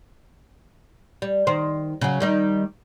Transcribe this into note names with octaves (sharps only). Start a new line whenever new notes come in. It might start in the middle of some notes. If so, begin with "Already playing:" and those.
G3
D#3 C5
C#3 F#3
D#3 G3 D#4